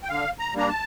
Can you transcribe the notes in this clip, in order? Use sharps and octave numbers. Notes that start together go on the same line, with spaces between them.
G5
D3 F5
A#5
G3 A#3 D4 A#5
A5